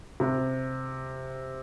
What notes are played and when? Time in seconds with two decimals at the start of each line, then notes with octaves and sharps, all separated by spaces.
0.20 C3